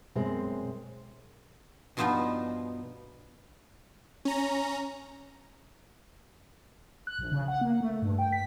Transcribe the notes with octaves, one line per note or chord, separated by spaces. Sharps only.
F#2 B2 G#3 C4
G2 B2 F3 B3 D#4 F4
C#4 A#5
F#6
A#1
C#3
F#5
A#3
A3
G2
G5
B6